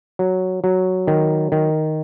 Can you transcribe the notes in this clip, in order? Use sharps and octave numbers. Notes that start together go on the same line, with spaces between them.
F#3
F#3
D#3
D#3